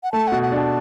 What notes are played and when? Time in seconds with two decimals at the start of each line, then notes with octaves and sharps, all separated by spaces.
0.03 F#5
0.12 A3 A5
0.27 B2 F#5
0.42 F#5
0.52 D4
0.58 A5